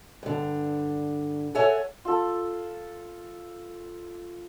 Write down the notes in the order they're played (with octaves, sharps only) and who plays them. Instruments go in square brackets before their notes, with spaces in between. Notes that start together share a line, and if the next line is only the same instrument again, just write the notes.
[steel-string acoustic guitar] G2 D3
A4 C#5 E5 F#5 G#5
[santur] F4 A4